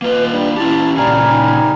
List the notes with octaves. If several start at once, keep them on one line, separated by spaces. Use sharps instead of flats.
A#3 F4 B4 D#5
G3 D4
C#4 E4 G4 A5
A#2 C#3 G3 A#4 D5 G#5
D#4